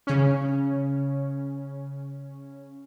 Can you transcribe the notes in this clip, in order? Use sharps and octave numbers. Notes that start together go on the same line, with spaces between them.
C#3 C#4